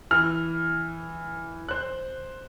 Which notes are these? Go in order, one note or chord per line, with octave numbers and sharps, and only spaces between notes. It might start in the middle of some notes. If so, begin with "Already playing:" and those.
E3 F6
C5 F#6